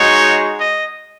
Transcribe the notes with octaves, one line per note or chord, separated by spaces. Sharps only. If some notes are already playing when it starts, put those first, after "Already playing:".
Already playing: G#3 D#4 F#4 C#5
D#5